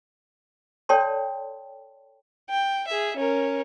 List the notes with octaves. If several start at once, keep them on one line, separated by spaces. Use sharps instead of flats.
A4 C#5 D5 G5 A5 C6
G5
G#4 E5
C#4 A#4